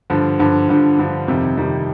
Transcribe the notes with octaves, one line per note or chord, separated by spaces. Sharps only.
G2 D3 F3
G2 D3 F3
G2 D3 F3
G2 D3 F3
F2 C3 D#3 G3
F2 C3 D#3 G3